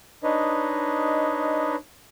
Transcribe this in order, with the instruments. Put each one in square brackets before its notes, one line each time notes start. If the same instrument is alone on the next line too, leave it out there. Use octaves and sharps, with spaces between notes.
[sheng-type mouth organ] D4 D#4 B4 C#5 D#5